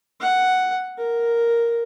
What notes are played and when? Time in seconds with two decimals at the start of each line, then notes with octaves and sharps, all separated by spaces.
0.20 F#5
0.98 A#4